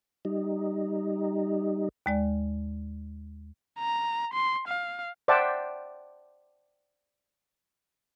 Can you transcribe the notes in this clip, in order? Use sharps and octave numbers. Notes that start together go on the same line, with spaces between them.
G3 D#4
D#2 G#3 D5
A#5
C6
F5
C5 D5 E5 F#5 G5 A5